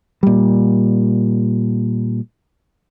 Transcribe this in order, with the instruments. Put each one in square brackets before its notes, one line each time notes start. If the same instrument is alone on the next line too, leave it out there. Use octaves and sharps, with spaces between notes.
[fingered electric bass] A#2 G3